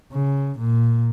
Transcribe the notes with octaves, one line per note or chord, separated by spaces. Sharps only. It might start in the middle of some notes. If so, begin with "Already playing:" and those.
C#3
A#2